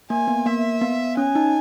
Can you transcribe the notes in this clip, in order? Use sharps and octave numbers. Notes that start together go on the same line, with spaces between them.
A#3 G#5
B3
A#3 E5
B3
C#4 G#5
D#4